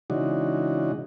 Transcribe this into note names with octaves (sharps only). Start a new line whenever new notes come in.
C#3 E3 G#3 D4 D#4 F#4